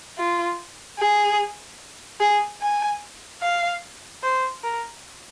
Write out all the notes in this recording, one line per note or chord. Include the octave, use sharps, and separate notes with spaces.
F4
G#4
G#4
G#5
F5
C5
A#4